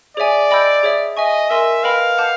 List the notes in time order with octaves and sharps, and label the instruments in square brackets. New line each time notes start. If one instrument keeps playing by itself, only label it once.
[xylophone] G#4 C#5 E5 G#5 [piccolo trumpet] D5
[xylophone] D#5 G5 B5 E6 G6
G#4 C#5 E5
[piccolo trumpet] D#5 [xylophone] E5 G#5 C#6
[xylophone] A#4 D#5 G#5 C6 [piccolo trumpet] E5
[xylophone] B4 D#5 G5 B5 [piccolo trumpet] F5
[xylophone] F#5 A5 D6 G6